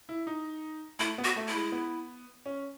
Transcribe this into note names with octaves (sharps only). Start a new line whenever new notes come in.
E4
D#4
A3 E4
B3
F#4
A3
E4
G#3
B3
C#4